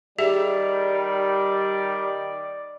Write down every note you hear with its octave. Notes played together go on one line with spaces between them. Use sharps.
D#3 G3 G4 G#4 D5 E5